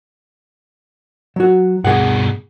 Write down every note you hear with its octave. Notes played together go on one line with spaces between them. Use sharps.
F#3 F#4
G2 B2 G#4 F#5